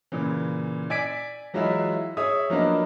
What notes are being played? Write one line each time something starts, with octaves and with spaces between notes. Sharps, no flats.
A#2 C#3 E3
D5 G#5 G#6 B6 D7
E3 F#3 G#3 E4 F4 E5
G#4 C#5 E5 D#6
F3 F#3 A#3 B3 D4 D#5